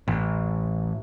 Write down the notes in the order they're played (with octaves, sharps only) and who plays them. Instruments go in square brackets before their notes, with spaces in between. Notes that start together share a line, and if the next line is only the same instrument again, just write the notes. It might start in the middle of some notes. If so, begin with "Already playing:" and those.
[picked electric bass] A1